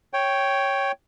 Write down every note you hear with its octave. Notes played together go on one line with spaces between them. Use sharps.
C#5 G5